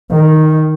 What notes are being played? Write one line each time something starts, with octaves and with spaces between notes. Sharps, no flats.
D#3